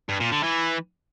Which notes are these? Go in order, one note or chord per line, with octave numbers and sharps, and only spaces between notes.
G2
A#2
D3
E3